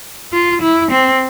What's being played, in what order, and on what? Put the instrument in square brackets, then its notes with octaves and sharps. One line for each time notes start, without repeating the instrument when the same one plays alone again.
[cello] F4
E4
C4